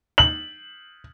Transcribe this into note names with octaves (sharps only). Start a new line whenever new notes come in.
F#7